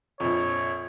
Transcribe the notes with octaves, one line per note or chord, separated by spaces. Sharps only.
A#1 F2 C#5